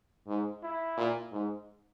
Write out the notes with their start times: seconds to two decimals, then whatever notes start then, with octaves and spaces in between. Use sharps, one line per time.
0.28 G#2
0.63 E4
0.97 A#2
1.32 G#2